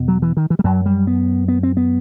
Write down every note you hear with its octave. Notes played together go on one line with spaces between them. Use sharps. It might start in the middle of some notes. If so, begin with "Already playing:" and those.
Already playing: E2 B2
F#3
E3
D#3
E3
G3
F#2 F#3
G3
B3
B3
C4
B3